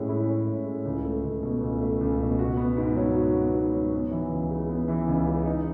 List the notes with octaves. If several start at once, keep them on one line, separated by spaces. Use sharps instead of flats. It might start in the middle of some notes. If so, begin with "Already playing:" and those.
Already playing: A2 G#3 C#4
E4
C#4
A2
G#3
C#2
A3
C#2
B2
C#2
A3
C#2
B2
F#4
B3
G#2
F#3
F#4
B3
G#2
F#3
B3
E3
C#2
C#3
B3
E3
C#2
C#3
D#4